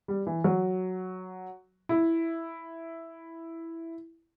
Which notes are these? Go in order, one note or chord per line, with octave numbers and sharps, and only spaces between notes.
G3
E3
F#3
E4